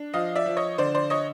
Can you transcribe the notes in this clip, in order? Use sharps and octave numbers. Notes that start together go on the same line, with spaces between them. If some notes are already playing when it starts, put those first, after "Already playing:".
Already playing: D4
F3 D#5 F5
D5 E5
F3
C#5 D#5
D3 C5 D5
C5 D5
C#5 D#5